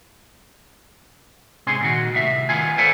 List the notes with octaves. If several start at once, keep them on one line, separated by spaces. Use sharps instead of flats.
G#2 C3 C#4 G#4 C6
A#2 D#3 F#4
C2 A2 E5
D#3 B3 F4 G#5
A4 B4 C5 D5 F5 G#5